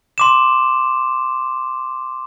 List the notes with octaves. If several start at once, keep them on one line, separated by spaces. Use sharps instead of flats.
C6 D6 E7